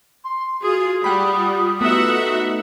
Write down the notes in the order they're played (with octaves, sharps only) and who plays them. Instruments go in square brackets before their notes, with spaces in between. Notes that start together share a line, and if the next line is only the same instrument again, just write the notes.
[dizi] C6
[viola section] F4 G#4 [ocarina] F#4 [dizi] D#6
[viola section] G3 [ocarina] F4 [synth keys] F#5 G5 B5
[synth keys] A3 B3 D#4 [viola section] F#4 E5 F#5